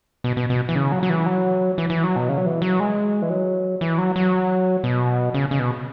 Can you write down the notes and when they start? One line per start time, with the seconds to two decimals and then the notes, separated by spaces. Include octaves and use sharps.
0.24 B2
0.37 B2
0.50 B2
0.69 E3
0.75 C#3
0.92 F#3
1.03 F#3
1.10 E3
1.26 F#3
1.78 E3
1.90 E3
2.04 F#3
2.16 B2
2.29 C#3
2.38 F#3
2.46 E3
2.62 F#3
2.80 G#3
3.22 E3
3.30 F#3
3.81 E3
3.98 F#3
4.16 F#3
4.84 B2
5.34 C#3
5.51 C#3
5.60 B2